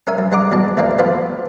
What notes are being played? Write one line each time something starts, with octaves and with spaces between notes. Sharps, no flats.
C#4 A#4 E5 G#5
F#2
G2 G#3 F#5 A#5 D6
E2 F#3 G#3 A5
D#2 G#2 D#3 E3 A#3 D4
E3 F3 A3 B3 E4 F4